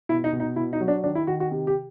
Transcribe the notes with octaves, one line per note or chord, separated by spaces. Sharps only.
B2 E4
D#4
B2
D#4
B2 E4
D#4
F#3
D4
D#3 D4
E4
D#3 F#4
F#4
C3
G4